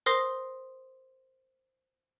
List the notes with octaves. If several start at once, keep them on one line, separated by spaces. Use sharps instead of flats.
A#4 C5 C6 D#6 A#6 C7